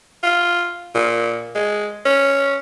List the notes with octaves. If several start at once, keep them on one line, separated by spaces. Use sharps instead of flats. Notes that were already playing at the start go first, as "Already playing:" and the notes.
F4
A#2
G#3
C#4